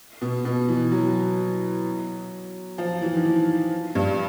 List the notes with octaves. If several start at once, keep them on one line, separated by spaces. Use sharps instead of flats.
B2
B2
E3
F#3
F3
E3
D#3
E3
G2